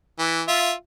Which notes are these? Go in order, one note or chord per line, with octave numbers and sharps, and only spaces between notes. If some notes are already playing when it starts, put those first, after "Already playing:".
E3
F4 E5